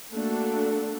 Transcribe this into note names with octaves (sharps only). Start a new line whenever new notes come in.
A3 A#3 D4 F#4 A4